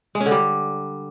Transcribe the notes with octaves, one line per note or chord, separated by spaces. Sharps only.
G#3
C#4
D3
G3